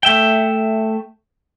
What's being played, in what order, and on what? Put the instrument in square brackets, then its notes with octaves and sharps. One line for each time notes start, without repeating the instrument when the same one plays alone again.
[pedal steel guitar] A3 E5 G5